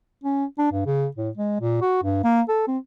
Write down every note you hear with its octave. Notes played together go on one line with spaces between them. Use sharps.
C#4
D4
G2
C#3
A2
G#3
A#2
F#4
G2
A#3
A4
C4